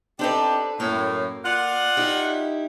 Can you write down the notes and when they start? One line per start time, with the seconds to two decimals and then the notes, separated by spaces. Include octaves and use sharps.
0.19 C4 D4 D#4 G4 A4 B4
0.80 F#2 A2 A#3
1.45 F4 D5 F#5
1.97 D#4 E4 G4